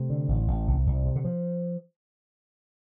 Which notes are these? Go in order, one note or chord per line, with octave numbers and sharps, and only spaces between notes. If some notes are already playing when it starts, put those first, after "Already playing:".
Already playing: C3 A3
D3
A1
A1
C2
C2
C3
D3
F3